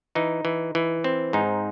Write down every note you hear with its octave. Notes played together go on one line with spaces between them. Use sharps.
E3 D#4
E3
E3
C4
G#2 D#4